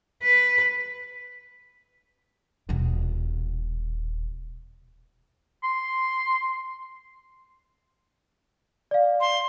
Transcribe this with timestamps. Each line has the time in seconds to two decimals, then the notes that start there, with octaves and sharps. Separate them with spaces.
0.23 B4
2.69 D#1 B2
5.63 C6
8.91 D5 F5
9.21 C6